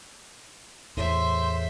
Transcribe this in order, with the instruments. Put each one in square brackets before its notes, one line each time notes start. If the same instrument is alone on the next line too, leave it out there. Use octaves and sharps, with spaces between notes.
[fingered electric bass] E2 A2 [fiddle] C5 E5 [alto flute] C6